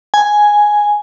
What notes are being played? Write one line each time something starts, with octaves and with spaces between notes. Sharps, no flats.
G#5